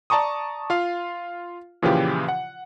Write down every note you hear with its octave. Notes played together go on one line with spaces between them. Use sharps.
D5 A5 A#5 C#6 D#6
F4 F5
A#2 C#3 E3 F3 F4 G4
F#5